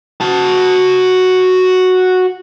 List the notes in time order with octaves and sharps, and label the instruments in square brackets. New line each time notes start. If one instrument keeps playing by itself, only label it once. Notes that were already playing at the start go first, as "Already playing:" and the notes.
[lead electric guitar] F#4 A5